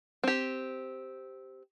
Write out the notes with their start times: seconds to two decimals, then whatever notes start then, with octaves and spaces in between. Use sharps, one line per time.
0.24 C4 G4